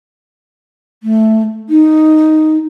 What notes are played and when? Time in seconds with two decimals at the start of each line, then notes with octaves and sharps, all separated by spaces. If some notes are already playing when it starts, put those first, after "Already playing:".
1.03 A3
1.69 D#4